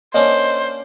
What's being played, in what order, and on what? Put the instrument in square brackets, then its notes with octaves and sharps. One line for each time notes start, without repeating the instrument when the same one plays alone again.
[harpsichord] A#3 C#4 D4 [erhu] C5 [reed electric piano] D#5